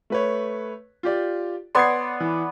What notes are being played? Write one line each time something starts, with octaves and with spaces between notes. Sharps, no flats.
A3 B4 C#5
F4 G4 D5
B3 D5 C6 G#6 C7
E3